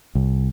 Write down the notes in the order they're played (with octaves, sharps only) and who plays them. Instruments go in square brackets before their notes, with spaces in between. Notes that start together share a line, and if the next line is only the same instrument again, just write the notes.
[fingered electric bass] C2